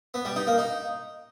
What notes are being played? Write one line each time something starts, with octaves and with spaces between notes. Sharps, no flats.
B3
G3
D#4
A#3
D#4